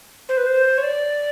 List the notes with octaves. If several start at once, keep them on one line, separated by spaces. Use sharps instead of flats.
C5
B4
C5
C#5
D5